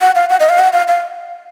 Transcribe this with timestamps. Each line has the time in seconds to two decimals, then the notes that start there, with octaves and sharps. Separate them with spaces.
0.01 F#5
0.15 F5
0.30 F#5
0.40 D#5
0.49 F5
0.59 F#5
0.73 F5
0.88 F5